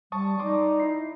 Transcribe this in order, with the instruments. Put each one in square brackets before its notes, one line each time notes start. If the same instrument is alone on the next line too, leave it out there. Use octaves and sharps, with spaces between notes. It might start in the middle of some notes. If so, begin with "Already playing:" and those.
[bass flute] G3 [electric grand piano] A5 C#6 D#6
[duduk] D#4 [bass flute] D5 [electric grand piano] C6 D6 D#6
[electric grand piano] E4 C7